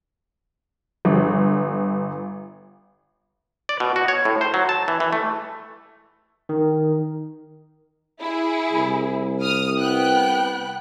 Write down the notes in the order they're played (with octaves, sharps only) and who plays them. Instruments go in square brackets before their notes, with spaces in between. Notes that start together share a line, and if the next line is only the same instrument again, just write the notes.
[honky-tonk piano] G1
[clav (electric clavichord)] D5
B2
F#4
C#5
A2
C5
F#3
A5
E3
E3
A3
[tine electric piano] D#3
[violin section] E4 G#4
[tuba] C2
[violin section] D#6 F6
B3 G5 F#6